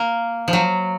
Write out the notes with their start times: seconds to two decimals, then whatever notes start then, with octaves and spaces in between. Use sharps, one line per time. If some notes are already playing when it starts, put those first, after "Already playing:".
Already playing: A#3
0.48 F3
0.53 F#3